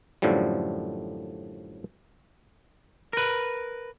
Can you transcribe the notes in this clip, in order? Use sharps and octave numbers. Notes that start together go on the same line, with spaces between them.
F#2 A2 D3 F3 G3
A#4 B4